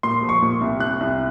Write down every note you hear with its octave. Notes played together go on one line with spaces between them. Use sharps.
A#2 C6
F3
C#6
A#2
C2
C2 F#6
C2